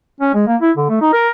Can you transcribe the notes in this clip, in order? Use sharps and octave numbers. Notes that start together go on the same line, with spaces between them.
C#4
G#3
A#3
E4
D3
A3
D#4
A#4